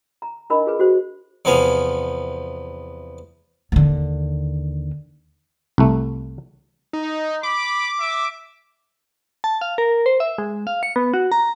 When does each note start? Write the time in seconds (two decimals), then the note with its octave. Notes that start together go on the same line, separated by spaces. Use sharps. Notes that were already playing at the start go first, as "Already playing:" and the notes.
0.22 A#5
0.50 D4 D#4 A#4 D#5 B5
0.66 F4 G#4 B4
0.79 F#4 C5
1.45 E2 C3 F3 B3 F5 G#5
3.72 D#2 D3
5.78 C2 A3
6.93 D#4
7.43 B5 D6
8.00 E5
9.44 A5
9.61 F5
9.78 A#4
10.06 C5
10.20 E5
10.38 G#3
10.67 F5
10.83 C#7
10.96 B3
11.14 F#4
11.32 A#5